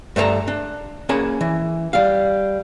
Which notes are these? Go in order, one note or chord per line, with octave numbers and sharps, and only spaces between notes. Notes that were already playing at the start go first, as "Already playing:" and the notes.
G2 A3 B4 A5 A#5
D4
A#3 C#4 G#4 A5 B5
E3
G3 F5